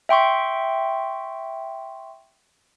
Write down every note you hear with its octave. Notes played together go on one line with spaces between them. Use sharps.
E5 G5 C6 C#6